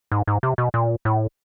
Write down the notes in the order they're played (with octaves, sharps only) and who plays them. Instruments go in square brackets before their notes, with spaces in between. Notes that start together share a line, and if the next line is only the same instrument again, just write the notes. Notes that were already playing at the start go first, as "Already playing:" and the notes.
[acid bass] G#2
G#2
C3
B2
A#2
A2